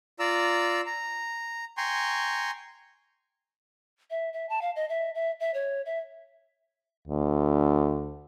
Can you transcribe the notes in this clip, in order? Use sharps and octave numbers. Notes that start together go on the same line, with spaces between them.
F4 D5 A#5 E6
A#5
G5 G#5 A#5 C6 C#6
E5
E5
A5
F5
D#5
E5
E5
E5
C#5
E5
D2